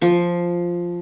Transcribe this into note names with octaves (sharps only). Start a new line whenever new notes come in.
F3 C#6